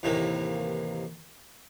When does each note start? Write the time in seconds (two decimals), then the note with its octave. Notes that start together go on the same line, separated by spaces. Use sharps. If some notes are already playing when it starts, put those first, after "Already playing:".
0.03 D#2 A2 C3 E3 A#3